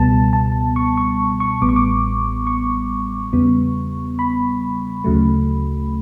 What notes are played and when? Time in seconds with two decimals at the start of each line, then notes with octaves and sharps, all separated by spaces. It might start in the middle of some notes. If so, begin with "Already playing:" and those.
Already playing: C#2 B2 G3 B3 A5
0.33 A5
0.76 C#6
0.97 C#6
1.40 C#6
1.61 A1 A2 G3 B3 D6
1.69 C#6
1.76 D6
2.47 C#6
3.33 E2 C#3 G3 B3
4.19 B5
5.04 D2 C#3 F#3 A3